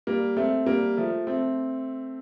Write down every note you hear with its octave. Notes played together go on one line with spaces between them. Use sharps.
G3 A#3
A3 C4
G3 A#3
F3 A3
A3 C4